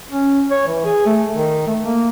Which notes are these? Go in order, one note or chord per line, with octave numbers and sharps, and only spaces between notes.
C#4
C#5
E3
G#4
A3
D#3
A3
A#3